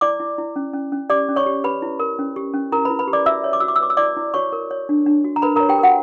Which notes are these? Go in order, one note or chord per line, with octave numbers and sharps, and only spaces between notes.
E4 D5 D6
E4
E4
C#4
C#4
C#4
G4 D5 D6
C#4
C#5 C#6
G4
G4 B4 B5
E4
A#4
C#4
G4
C#4
E4 A#4 A#5
B4 B5
E4
B4 B5
G4
D5 D6
F#4 E5 E6
C#5
D6
F#4 E6
D6
E6
B4 D6
E6
E4 D5 D6
E4
F#4 C#5 C#6
A#4
C#5
D4
D4
F#4
A#5
A#4 B4 B5
A#4 C#5 A#5
G4 G5
F#4 A#4 F#5